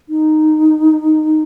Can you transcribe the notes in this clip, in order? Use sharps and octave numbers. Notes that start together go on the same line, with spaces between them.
D#4